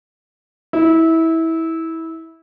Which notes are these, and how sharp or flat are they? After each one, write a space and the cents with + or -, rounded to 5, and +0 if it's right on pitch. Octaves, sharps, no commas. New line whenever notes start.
E4 -20